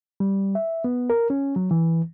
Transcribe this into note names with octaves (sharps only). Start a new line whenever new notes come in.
G3
E5
B3
A#4
C#4
F#3
E3